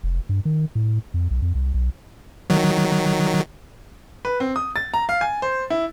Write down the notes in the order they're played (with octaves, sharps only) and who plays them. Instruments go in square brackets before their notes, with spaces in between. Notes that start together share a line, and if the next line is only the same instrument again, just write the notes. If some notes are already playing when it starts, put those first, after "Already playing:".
[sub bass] F1
G2
D#3
A2
F2
B1
F2
C2
B1
[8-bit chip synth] D#3 F#3
[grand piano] B4
C4
D#6
A6
A#5
F5
G#5
C5
E4